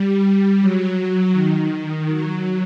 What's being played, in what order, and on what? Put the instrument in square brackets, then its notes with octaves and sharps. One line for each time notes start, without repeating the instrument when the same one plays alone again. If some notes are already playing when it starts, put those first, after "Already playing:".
Already playing: [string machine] G3
F#3
D#3
F#3